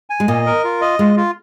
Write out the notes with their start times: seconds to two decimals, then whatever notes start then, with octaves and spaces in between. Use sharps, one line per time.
0.10 G#5
0.20 G#3
0.28 A#2 A#3 D#5
0.46 A#4
0.64 F4
0.81 D#5
0.99 G#3 F4
1.16 F4